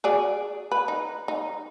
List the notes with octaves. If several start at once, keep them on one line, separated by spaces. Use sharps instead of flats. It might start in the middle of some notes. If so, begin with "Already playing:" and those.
F#4 G#4 D5
B4
D#4
D#4